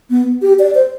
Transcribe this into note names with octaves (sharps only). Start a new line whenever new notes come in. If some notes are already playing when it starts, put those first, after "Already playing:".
B3
G4
D5
C5